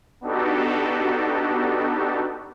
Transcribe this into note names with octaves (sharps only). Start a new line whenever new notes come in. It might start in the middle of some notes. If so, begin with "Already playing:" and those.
B3 D4 D#4 F#4 G4 A4